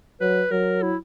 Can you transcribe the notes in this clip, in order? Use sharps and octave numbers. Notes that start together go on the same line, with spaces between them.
F#3 B4
F#3 A#4
E4